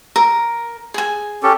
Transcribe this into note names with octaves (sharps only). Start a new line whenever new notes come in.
A#4
G#4 G#5
C#4 G4 A4